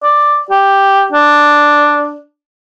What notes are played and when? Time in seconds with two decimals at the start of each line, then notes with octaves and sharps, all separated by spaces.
0.03 D5
0.50 G4
1.12 D4